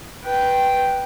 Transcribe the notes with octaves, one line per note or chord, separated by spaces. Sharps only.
B4 G5